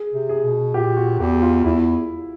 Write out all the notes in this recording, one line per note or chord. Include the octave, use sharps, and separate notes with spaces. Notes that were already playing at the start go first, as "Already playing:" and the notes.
Already playing: G#4
C3
G#4
B2
A#2 G4
F#4
E2 G4
F4
E2 E4